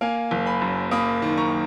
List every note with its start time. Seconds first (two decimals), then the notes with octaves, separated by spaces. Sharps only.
0.01 A#3 F5 G#5
0.31 F#1
0.46 G#5 B5
0.62 F#2
0.91 A#3 B5 D#6
1.22 D#3
1.37 A#5 C#6